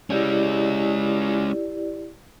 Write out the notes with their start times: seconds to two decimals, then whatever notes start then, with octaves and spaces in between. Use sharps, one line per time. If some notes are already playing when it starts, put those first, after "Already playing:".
0.10 G#3 C#4 E4 G4 D5